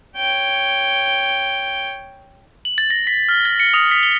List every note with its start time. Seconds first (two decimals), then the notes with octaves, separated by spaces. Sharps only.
0.16 C#5 G5
2.65 F#7
2.78 A6
2.90 A#6
3.07 B6
3.29 F6
3.45 A6
3.60 C#7
3.74 D#6
3.91 B6
4.03 G7